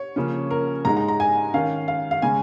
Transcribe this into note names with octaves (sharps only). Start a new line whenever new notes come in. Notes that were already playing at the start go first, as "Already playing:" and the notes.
Already playing: C#5
C#3 F3 A#3 C#4
A#4
G#2 G#3 D#4 A#5
A#5
A#5
G#5
D#3 C#4 F5
F5
F5
C#3 G#3 C#4 G#5